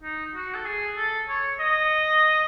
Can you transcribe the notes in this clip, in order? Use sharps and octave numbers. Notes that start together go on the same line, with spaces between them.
D#4
F#4
A4
G#4
A4
C#5
D#5